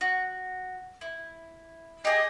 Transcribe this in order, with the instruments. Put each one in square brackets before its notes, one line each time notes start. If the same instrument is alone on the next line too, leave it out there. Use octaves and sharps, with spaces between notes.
[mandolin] F#4
E4
[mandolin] G4 G#4 [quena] D#5